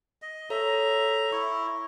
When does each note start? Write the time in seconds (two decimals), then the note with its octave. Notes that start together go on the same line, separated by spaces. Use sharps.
0.22 D#5
0.50 A4 C#5 E5 A#5
1.32 E4 C#6